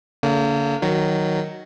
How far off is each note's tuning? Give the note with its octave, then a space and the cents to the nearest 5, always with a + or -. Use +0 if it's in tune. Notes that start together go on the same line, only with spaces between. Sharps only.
D3 -45 A#3 -30
D#3 +0 F#3 +5